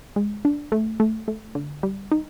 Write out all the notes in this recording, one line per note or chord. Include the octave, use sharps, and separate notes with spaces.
G#3
D4
A3
A3
A3
D3
G3
D#4